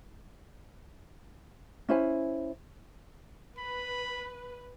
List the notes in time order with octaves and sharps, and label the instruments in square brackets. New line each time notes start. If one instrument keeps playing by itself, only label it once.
[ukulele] C#4 E4 C5 G#5
[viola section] B4 [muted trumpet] B5